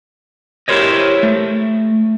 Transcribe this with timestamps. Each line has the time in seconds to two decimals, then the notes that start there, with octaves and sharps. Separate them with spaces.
0.68 E4 G4 A#4 C5 C#5 D#5
1.23 A3